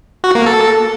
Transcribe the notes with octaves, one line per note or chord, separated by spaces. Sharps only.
F#4
A#3
A4